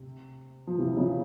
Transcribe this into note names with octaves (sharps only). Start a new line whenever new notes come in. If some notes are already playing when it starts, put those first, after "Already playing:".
Already playing: C3
F3
C3 E3
C#3 F3